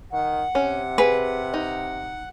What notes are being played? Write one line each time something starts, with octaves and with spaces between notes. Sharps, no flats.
D#3 F#5
C3 C#4
G#4 B4
D#4